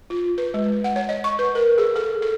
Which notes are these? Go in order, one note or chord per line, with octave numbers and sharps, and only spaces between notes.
F4
B4
G#3
F#5
C#5
D#5
C#6
B4
A#4
G#4
A4
A4